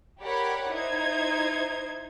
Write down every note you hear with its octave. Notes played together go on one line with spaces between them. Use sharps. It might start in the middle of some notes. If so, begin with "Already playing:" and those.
G4 A#4 C#5 D5 F#5 B5
D#4 E4 C5 G#6